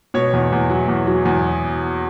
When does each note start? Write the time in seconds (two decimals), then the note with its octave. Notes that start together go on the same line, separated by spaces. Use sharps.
0.14 B2 C#5
0.33 E2
0.52 E2
0.70 F#3
0.88 E2
1.07 F#3
1.25 E2